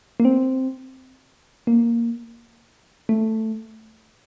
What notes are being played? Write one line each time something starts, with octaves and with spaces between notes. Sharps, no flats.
A#3
C4
A#3
A3